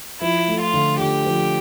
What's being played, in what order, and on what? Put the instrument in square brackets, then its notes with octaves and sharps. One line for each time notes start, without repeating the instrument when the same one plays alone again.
[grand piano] F3 [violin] E4
[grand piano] A3
[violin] F4
[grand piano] D3
[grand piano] D3 [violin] G4
[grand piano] F3